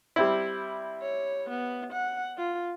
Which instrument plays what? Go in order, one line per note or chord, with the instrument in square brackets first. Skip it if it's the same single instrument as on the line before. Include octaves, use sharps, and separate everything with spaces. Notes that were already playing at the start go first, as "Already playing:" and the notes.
[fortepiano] G3 C4 E4
[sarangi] C#5
B3
F#5
F4